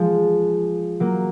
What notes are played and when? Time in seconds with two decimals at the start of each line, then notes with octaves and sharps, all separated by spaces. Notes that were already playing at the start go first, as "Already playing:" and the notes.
Already playing: F3 G#3
1.00 F#3 A#3